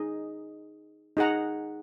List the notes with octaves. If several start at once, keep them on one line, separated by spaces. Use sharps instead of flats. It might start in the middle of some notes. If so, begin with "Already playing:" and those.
Already playing: D#4 G#4 D#5
D#4 G#4 F#5 A#5